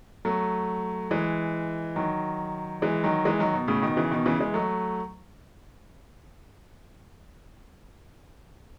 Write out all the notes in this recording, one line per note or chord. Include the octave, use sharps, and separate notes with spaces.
F#3 A3
E3 G#3
D#3 F#3
E3 G#3
D#3 F#3
E3 G#3
D#3 F#3
B2
A2 C#3
B2 D#3
C#3 E3
B2 D#3
C#3 E3
E3 G#3
F#3 A3